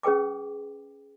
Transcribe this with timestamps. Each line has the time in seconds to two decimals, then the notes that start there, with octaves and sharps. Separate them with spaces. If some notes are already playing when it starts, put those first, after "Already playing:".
0.03 C#4 G#4 B4 G5 D6